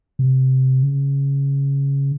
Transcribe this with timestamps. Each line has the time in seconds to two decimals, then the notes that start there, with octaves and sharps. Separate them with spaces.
0.19 C3
0.83 C#3